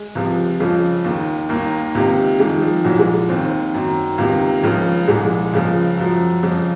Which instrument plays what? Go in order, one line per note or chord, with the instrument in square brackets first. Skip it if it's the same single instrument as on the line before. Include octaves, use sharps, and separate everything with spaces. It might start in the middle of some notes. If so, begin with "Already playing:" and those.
Already playing: [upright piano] G#3
C#2 C3 F3
F2 C#3 F3
D#2 D#3
D#2 D#3 A#3
C#2 C3 D#3
F2 D#3 G#3
F3
C2 A#2 F3 F#3
G#3
D#2 D#3 C4
F#2 D#3
C#2 C3 D#3 A#3
C#2 C#3 F3
C2 A#2 F3 G#3
C#2 C#3 F3
F#2 F3
F2 C#3 F3